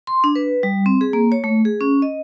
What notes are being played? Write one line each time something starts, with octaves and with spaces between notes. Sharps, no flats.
C6
D4
B4
G3
C4
G#4
A#3
C#5
A3
G#4
C#4
D#5